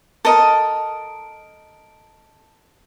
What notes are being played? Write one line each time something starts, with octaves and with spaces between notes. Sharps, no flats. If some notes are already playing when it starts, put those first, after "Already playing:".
A4 A#4 D#5